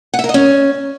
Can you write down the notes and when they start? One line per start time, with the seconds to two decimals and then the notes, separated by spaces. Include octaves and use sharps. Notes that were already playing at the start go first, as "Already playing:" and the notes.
0.14 F#5
0.19 E5
0.24 A#4
0.29 D#5
0.34 C#4